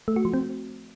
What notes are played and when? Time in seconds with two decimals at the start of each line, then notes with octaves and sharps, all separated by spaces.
0.08 A3
0.16 F#4
0.25 F3
0.34 C4